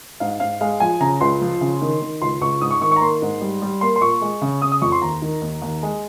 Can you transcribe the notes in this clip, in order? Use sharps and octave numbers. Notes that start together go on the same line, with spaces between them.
G#2 F5
G#2 F5
G#3 F5
F3 G#5
C#3 A#5
C#2 C6
F3
C#3
D#3
D#3
C#2 C6
C#2 C#6
G#2 D#6
C#6
D#3 C#6
A#5 C#6
A#3 C6
G#2
G3
G3
A#3 C6
C6
A#2 C#6
G#3
C#3
C#3 D#6
D#6
F2 C#6
C6
D#2 A#5
D#3
D#2
D#2
G#3